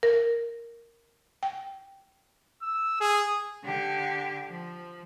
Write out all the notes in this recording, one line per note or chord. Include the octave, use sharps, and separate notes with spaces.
A#4
G5
E6
G#4
D3 G4
F3